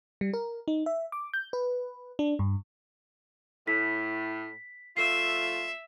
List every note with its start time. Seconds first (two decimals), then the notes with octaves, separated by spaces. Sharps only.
0.21 G3
0.34 A#4
0.68 D#4
0.86 E5
1.12 D6
1.34 G6
1.53 B4
2.19 D4
2.39 G2
3.67 A2 B6
4.97 F3 A3 F4 E5 C7